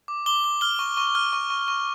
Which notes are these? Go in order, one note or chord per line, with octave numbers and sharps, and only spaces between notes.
D6
D6 G7
D6
F6 G7
C#6
C#6
F6
C#6
C#6
C#6